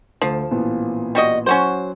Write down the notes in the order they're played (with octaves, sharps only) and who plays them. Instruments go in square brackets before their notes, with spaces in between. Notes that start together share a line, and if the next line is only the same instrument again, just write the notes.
[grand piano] D2 [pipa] F3
[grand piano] A1 A#2 B3
[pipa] G3 F#4 D#5
[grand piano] F#3 [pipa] C#4 F#4 C5